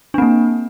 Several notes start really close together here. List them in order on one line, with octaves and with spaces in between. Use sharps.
D4 C4 A#3